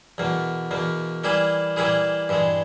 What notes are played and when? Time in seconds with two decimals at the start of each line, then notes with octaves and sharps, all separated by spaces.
0.18 E2 B2 A#3
0.71 E2 B2 A#3
1.24 E3 G3 A#3 E4 G#4
1.76 E3 G3 A#3 E4 G#4
2.29 G2 E3 G#3